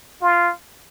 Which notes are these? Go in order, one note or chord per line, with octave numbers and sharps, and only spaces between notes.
F4